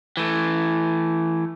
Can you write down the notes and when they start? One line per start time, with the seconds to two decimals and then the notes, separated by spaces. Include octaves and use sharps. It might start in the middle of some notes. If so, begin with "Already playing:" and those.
0.17 E3 A3